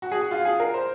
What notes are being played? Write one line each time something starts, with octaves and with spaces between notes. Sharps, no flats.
F#4
G#4
F#4
F4
G#4
A#4
C5